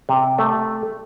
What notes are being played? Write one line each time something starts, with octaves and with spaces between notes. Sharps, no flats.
C3
A3